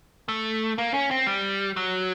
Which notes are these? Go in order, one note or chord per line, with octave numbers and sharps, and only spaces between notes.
A3
A#3
C#4
C4
G3
F#3